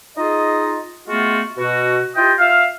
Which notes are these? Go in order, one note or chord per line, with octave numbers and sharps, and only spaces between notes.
D#4 F4 G#4 D#5
G#3 A3 B3 F4 F#4
B2 F#4
E4 F4 G4 D#5 G5
F4 E5 F5